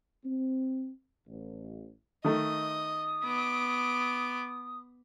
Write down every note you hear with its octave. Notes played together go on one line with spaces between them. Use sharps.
C4
A1
D#3 A3 D#5 D#6
B3 D6